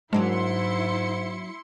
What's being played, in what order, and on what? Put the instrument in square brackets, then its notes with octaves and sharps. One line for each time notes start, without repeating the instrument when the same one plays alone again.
[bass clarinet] G#2 [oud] F#3 A#3 D4 [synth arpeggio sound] G#3 [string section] E4 C6 C#7